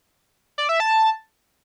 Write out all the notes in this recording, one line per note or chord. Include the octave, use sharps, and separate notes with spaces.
D5
E5
A5